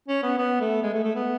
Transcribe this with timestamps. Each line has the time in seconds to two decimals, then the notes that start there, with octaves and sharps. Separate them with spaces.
0.08 C#4
0.23 B3
0.38 B3
0.61 A3
0.83 G#3
0.94 A3
1.04 A3
1.16 B3